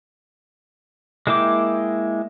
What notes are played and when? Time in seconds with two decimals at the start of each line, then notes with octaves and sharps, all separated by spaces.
1.27 G#3 A#3 E4 G5 D6